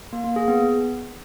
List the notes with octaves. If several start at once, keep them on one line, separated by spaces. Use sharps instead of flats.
A#3
A#3
G#4
B3